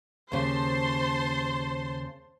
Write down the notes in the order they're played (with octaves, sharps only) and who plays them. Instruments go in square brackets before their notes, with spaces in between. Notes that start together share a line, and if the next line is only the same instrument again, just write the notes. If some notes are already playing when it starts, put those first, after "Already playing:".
[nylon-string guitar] D#2 C#3 [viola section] C5 A5 C6